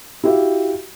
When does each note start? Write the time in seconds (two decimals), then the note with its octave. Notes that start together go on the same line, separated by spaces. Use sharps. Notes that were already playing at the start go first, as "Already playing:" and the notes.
0.24 E4 F#4 G4 E5 F5